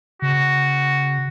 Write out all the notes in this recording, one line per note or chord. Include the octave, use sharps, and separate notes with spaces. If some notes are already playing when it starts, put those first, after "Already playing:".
C#3 F#4